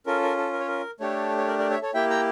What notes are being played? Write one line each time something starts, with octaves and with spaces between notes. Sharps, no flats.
C#4 F4 A4 A#4
A#4
A4
A#4
C#5
A#4
A3 D4 G4 A4 C#5
C#5
A#4 D5
A#4 D5
C#5 E5
A4 C#5
A#3 E4 G4 E5 G5
G5 A#5